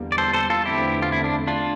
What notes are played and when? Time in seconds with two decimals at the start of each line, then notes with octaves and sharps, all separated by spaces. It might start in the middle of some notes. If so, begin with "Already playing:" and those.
Already playing: E2 D3 G3 A#3
0.12 D5
0.18 A4 C5
0.33 A4 C5
0.50 F4 A4
0.65 E2 D3 A3 C4 E4 G4
1.02 F4
1.12 E4
1.24 D4
1.47 D4 F4